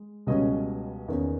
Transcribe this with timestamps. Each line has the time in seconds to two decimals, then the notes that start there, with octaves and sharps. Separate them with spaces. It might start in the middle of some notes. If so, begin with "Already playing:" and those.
Already playing: G#3
0.27 C#2 B2 G3 C#4 D#5
1.08 E2 D#3 A#3 C#4